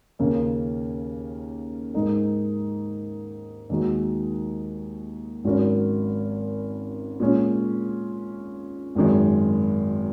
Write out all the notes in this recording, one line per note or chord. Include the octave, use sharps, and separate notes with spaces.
D#2 C#3 A#3 C#4
G#2 G#3 D#4 A#4
D#2 D#3 G#3 D#4 F#4
G#1 G#2 F#3 C#4 A#4
A#2 G#3 C#4
G#1 F#2 D#3 G#3